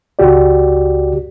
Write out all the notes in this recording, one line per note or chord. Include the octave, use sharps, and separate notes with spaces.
C#2 F#4 G4 D5